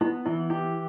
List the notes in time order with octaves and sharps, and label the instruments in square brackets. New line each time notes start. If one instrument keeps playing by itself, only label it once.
[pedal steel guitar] B3 [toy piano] E4
[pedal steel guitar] E3 [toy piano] E4
[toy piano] E4 [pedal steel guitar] G4